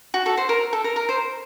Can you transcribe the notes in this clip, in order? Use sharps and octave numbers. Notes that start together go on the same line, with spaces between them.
F#4
A4
C5
A#4
A4
A#4
A#4
C5